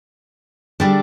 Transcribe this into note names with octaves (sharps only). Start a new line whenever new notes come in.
D3 G3 D4 A4